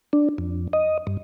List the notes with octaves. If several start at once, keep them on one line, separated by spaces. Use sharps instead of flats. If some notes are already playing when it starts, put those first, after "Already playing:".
D4
F2
D#5
G2